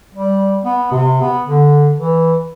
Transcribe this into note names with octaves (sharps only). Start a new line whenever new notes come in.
G3
B3
C3
B3
D3
E3